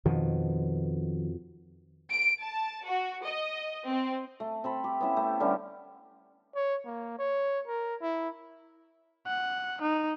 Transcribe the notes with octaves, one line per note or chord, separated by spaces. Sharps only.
F2 B2 D#3 F3
D7
A5
F#4
D#5
C4
A3
C4 A4 B5
G4
B3 C#4 E4 E5
A3
D3 G3 B3 C#4
C#5
A#3
C#5
A#4
E4
F#5
D#4